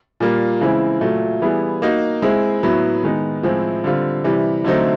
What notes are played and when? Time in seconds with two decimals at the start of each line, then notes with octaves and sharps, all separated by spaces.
0.20 A#2 G3 A#3
0.61 C#3 E3 G#3 C4 E4
1.01 A#2 F#3 A3
1.42 E3 G3 B3 E4 G#4
1.82 A#3 D#4 F#4
2.22 G#3 C4 E4 G#4
2.63 A2 F#3 B3 E4
3.03 D#3 G#3 B3 D#4
3.43 A2 F3 G#3 C4 E4
3.84 D3 G3 C4 F4
4.24 C3 E3 G3
4.65 D3 F#3 A3 C4 D#4